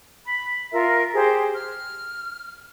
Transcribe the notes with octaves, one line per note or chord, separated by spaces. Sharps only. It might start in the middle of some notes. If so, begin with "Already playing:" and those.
B5
F4 A#4 E5
G4 G#4 C5
F6